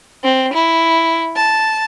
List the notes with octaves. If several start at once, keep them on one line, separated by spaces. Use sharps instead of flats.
C4
E4
A5